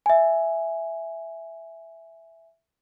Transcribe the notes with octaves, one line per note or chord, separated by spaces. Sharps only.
E5 G#5